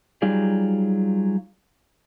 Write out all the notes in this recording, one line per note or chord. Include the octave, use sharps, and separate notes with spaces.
F#3 G3 D#4 F4 G#4 D5